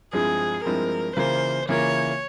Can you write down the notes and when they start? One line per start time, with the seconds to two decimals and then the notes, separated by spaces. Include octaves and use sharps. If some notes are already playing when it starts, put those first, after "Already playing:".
0.13 G2 F3 G#3 C4 E4 G#4
0.64 G2 F3 G#3 C4 E4 A#4
1.16 C#3 E3 A#3 F4 A#4 C5
1.69 C#3 E3 A#3 F4 A#4 C#5